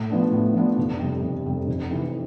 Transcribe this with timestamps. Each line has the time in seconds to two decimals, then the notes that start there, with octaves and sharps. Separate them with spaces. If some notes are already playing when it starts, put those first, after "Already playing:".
Already playing: A2
0.10 F3 B3 D4
0.31 A2
0.54 F3 B3 D4
0.77 F1
0.99 F2 C3 G3
1.22 F1
1.46 F2 C3 G3
1.68 F1
1.91 F2 C3 E3